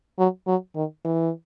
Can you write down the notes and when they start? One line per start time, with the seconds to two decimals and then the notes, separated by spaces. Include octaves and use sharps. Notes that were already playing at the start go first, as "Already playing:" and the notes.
0.18 F#3
0.47 F#3
0.76 D#3
1.05 E3